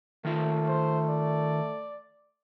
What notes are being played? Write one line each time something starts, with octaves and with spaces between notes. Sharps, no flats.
D#3 A3 F4
C5
D5